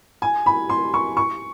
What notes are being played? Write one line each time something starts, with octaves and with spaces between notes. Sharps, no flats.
G#5
B5
C6
C#6
C#6